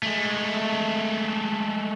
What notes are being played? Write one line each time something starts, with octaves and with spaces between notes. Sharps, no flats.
G#3 A3